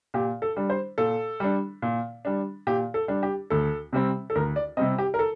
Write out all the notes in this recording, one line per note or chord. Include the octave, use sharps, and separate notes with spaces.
A#2 G4
A4
G3 D4
C5
A#2 A4
G3 D4
A#2
G3 D4
A#2 G4
A4
G3 D4
G4
D2 A4
C3 G3 C4
A4
D2 A#4
D5
C3 G3 C4 D#5
G4
A#4
A4